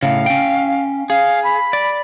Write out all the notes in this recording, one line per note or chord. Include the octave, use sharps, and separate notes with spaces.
A2 C#3 F5
C#4 G5
G#4 F5
B5
D5